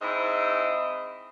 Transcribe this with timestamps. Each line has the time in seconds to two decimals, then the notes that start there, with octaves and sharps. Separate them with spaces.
0.02 G#2 C4 E4 D#5